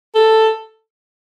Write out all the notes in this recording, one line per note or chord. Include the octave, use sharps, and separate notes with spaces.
A4